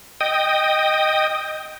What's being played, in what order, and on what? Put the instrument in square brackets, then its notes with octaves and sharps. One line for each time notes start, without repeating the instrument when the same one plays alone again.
[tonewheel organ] D#5 G5 D#6